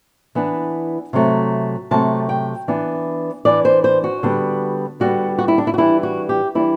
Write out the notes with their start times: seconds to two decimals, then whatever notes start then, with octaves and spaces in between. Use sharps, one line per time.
0.35 E3 B3 D4
1.13 C3 F#3 A3
1.91 C3 F#3 A3 A5
2.29 G5
2.68 E3 B3 D4
3.45 E3 B3 D4 D5
3.65 C5
3.84 C5
4.04 F#4
4.23 D3 G3 B3
5.00 D3 G3 B3 F#4
5.38 F#4
5.48 E4
5.58 D4
5.67 E4
5.74 F#4
5.78 E3 G3 D4 E4
6.03 F#4
6.29 G4
6.55 E3 G3 D4 E4